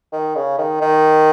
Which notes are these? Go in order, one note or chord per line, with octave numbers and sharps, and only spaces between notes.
D#3
C#3
D#3
D#3